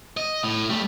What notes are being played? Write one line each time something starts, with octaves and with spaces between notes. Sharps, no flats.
D#5
A2
G3 A3